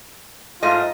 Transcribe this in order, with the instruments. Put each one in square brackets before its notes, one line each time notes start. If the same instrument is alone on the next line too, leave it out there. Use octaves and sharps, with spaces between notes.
[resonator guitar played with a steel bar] G#2 A3 D#5 [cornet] F4